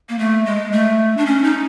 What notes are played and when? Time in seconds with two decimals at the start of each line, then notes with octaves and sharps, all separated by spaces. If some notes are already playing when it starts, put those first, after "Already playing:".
0.09 A#3
0.19 A3
0.46 G#3
0.72 A3
1.17 D4
1.26 C#4
1.44 D#4